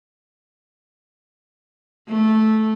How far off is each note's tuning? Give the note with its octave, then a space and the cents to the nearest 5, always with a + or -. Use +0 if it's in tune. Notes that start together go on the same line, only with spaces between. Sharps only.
A3 -10